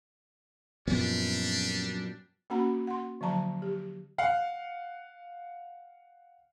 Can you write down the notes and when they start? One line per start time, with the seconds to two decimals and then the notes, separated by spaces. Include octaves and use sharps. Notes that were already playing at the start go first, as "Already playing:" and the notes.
0.87 F#2 A#2 F3 G3 B3 D4
2.50 A#3 C#4 F#4 F#5 A#5 B5
2.87 F#5 C6
3.21 D3 F3 F#3 A5 A#5
3.62 G4
4.18 F5 F#5